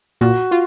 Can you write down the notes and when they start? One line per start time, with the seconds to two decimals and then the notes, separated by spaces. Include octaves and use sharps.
0.21 A#2 F#4
0.51 F4